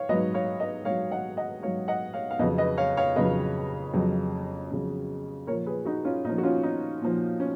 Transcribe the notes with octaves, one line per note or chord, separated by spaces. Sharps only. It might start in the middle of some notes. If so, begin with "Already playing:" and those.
Already playing: C#5 F5
G#2 F#3 B4 D#5
C#5 F5
B4 D#5
G#2 F#3 C#5 F5
D#5 F#5
D#5 F#5
G#2 F#3 C#5 F5
D#5 F#5
C#5 F5
F5
F2 C#3 F#3 B4 D#5
B4 D#5
C#5 F5
C#5 F5
F2 C#3 F#3 B4 D#5
F2 C#3 F#3
F2 C#3 F#3
A#2 F3 A#4 C#5
G#4 B4
D#4 F#4
C#4 F4
A#2 F3 D#4
F#4
C#4 F4
D#4
A#2 F3
C#4